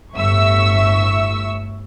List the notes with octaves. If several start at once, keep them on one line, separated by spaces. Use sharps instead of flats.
G1 A2 E5 C#6 E6